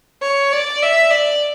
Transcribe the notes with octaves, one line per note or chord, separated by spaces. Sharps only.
C#5
D5
E5
D5